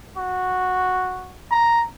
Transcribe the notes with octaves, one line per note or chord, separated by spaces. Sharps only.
F#4
A#5